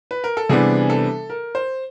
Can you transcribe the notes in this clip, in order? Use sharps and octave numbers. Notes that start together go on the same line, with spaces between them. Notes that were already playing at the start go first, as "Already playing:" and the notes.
B4
A#4
A4
C3 E3 G3 B3 D4 G#4
A4
A#4
C5